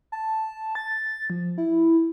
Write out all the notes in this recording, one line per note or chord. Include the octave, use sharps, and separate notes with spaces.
A5
A6
F3
E4